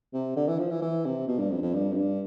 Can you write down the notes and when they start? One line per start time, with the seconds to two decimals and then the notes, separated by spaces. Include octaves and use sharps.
0.13 C3
0.36 D3
0.48 E3
0.59 F3
0.71 E3
0.82 E3
1.05 C3
1.28 B2
1.39 G2
1.51 F2
1.62 F2
1.74 G2
1.92 F2
1.96 G2